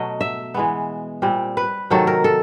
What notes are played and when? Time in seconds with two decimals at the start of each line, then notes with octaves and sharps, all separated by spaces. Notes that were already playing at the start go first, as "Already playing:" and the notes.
Already playing: B2 F#3 A3 D#5
0.21 E5
0.54 E3 G#3 B3
1.22 A#2 G3 C4
1.57 B4
1.90 C3 D#3 F#3 A3 A4
2.07 A#4
2.24 A4